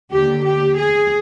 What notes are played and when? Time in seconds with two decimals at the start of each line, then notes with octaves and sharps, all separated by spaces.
0.11 D#2 D3 G4
0.45 G4
0.78 G#4